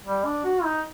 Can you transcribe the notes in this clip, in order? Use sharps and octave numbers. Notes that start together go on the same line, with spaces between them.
G3
D4
F#4
D#4